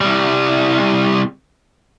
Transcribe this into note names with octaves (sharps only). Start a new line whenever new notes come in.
C2 G3